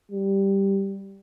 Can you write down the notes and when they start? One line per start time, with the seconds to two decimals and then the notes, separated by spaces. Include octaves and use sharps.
0.12 G3